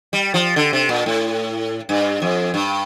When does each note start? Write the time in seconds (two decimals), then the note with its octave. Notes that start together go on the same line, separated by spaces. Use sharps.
0.13 G3
0.34 F3
0.56 D3
0.73 C3
0.89 A#2
1.06 A2
1.89 G2
2.22 F2
2.54 G2